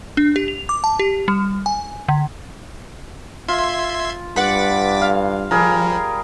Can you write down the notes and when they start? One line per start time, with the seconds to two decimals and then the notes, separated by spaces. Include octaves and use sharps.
0.17 D4
0.36 G4
0.48 F7
0.69 D6
0.84 A5
0.99 G4
1.28 G3
1.66 G#5
2.09 D3
3.48 F4 E5 C6 G#6
4.36 G2 B4 F#5 D6 A6 B6
5.01 F5
5.51 F3 G3 G#4 A#4